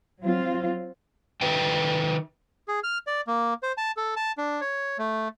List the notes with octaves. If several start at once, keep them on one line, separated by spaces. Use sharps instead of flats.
F#3 C4 F4
D#3 B4 E5 G5
G#4
F6
D5
A#3
C5
A5
A4
A5
D4
C#5
A3